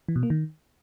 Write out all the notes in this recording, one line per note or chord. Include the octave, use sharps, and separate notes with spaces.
E3
B2
A#3
D#3